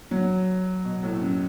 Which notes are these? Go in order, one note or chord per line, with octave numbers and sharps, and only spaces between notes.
F#3
B2
A2
F#2